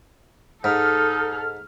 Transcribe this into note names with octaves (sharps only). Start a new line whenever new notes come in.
G#2 D#4 A4 F6